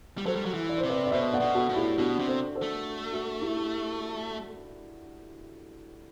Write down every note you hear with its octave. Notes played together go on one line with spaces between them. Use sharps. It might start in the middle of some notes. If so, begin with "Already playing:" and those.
G3
F#3 A4 C5
G3
F#3
E3
D5
C5
C3
B4 D5
D5
B2 C5 E5
D5 F#5
B2
F#4 A4
A2
E4 G4
B2 D4 F#4
C3
A4 C5
A4 C5
A3
F#4 A4
E4 G4